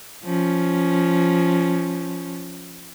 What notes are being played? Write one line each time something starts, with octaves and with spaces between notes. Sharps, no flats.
F3 C#4